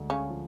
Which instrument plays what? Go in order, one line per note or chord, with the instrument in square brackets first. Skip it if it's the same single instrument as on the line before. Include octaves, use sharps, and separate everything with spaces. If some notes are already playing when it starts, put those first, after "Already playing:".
Already playing: [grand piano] D2 G#3
[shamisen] C#3 C#4
[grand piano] F3